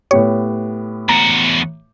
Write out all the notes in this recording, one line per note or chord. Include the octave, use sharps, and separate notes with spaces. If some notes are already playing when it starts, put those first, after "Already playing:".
A2 B3 G4 C#5
E2 F#4 A#5